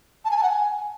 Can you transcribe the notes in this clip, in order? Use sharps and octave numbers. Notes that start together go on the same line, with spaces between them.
A5
G#5
A5
F#5
G#5